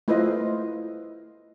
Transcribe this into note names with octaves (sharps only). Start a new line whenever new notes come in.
A3 E4 F4 B4 C5 D#5